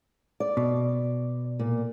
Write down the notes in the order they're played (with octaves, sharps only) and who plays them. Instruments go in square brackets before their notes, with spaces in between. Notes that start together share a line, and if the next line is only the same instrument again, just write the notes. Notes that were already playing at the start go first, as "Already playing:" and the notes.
[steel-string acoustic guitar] D5
[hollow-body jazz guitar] B2
[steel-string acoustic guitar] A#2